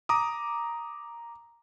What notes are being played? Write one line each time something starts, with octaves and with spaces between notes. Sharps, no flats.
A#5 D6 D#6